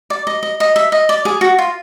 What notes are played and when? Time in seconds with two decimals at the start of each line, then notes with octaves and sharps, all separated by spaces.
0.10 D5
0.27 D#5
0.43 D#5
0.60 D#5
0.76 E5
0.92 D#5
1.09 D5
1.25 G#4
1.41 F#4
1.58 F4